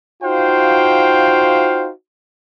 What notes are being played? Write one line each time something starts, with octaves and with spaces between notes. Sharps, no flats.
D#4 F4 F#4 C5 F5 G5